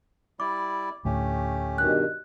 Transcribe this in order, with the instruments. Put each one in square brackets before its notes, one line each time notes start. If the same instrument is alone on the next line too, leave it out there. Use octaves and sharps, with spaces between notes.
[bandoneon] G3 E4 D5 [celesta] D6
[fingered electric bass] D2 A2 [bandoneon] A3 C#4 G4
[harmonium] G2 B2 D#3 [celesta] F#6